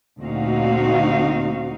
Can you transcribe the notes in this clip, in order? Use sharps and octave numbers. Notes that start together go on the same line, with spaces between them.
D2 A#2 C4 D#4 F#4 F5